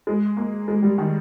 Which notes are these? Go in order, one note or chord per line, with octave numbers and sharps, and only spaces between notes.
G#3
A#3
G#3
G3
D#3